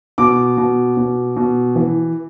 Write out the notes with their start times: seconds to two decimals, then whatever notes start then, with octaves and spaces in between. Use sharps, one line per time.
0.18 B2 D6
0.57 B2
0.97 B2
1.36 B2
1.75 E3